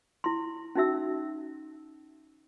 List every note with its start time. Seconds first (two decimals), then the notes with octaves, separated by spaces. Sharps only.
0.24 E4 C6
0.75 C#4 D#4 F#4 E5 E6